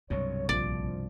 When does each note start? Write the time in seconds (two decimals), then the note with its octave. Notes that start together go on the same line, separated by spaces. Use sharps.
0.10 C2 G2 B2 F#3 C#5
0.49 A#1 F3 D5